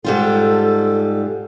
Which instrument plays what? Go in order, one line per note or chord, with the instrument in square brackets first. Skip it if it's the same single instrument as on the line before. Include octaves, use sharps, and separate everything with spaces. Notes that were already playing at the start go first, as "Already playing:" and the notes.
[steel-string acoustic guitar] G#2 G3 F4 [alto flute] A4